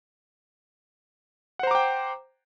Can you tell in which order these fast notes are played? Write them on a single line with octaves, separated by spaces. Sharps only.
F#5 C5 A#5 D6 G5